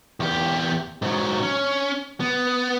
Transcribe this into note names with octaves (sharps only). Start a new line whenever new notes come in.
E2 G4
G#2 F#3
C#4
B3